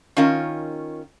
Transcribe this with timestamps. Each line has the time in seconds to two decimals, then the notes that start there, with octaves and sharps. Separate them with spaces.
0.17 D#3 C#4 F4 A#4